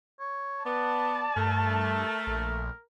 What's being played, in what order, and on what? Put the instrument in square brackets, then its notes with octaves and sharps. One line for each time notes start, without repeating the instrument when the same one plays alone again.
[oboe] C#5
[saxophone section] B3 [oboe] D5 [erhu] A5
[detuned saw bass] G2 [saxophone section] A3 [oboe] A#4
[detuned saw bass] A#1